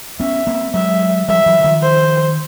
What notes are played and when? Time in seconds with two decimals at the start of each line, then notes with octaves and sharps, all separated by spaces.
0.20 B3 C#4 E5
0.47 A#3 C4
0.74 F#3 G#3 E5
1.28 F3 G3 E5
1.46 E3 F#3
1.64 D#3 F3
1.82 C5